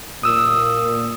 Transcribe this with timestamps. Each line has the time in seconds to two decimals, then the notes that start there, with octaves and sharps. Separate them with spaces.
0.23 A#2 D#6 E6